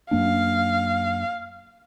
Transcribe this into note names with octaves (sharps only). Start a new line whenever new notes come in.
F#2 A#3 D4 F5